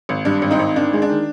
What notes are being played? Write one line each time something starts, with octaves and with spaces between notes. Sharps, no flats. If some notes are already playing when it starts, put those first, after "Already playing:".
G#1
G2 D4
G#1
C4 D#4
G#1
D#3 D4
G#3
D4
D#3